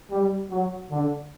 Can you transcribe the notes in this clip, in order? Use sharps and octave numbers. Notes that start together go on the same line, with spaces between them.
G3
F#3
D3